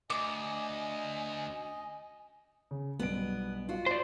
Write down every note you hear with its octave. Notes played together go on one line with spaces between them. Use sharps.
D2 D#5 G#5 D6
C#3
B1 G2 B3 D7
F4 F#4
C5 D5